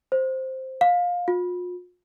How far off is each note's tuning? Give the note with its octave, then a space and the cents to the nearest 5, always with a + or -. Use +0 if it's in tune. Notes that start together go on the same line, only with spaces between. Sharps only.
C5 +5
F5 +20
F4 +40